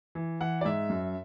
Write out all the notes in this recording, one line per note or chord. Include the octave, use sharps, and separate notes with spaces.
E3
E3 F#5
D5
G#2 E5
F#2